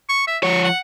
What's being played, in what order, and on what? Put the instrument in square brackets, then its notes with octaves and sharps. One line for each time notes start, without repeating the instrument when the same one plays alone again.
[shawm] C#6
E5
[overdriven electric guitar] F3 C#5 [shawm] C#6
[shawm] F#5